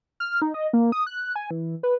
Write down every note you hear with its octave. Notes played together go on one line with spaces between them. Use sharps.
F6
D#4
D#5
A#3
D#6
F#6
G#5
E3
B4